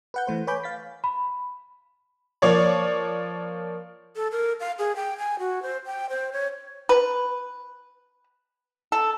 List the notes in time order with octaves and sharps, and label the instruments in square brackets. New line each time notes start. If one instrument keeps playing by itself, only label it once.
[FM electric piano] B4 F#5 G6
E3 A3 C5
B4 C#5 G#5 B5 D6 G6
F5 A6 B6
[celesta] B5
[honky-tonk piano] F3 A#3 C#5 D5
[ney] A4
A#4
F5
G#4
G5
G#5
F#4
C5
G5
C5
C#5
[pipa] B4
A4